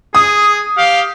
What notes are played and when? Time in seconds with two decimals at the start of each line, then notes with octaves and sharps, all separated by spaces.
0.15 G#4 D#6
0.78 G4 F5